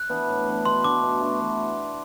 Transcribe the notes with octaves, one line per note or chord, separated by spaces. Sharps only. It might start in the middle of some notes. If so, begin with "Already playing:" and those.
Already playing: F#6
E3 B3 D4
A2
E3 B3 D4
B2 C6
A3 D4 F#4 D6
B2
A3 D4 F#4
E3